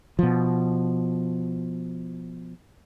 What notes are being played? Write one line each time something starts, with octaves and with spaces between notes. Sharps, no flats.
B2 F3